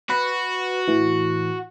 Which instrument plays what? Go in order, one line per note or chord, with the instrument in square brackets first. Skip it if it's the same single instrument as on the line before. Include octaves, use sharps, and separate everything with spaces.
[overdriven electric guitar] F#4 [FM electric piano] B4
[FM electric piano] A2 E3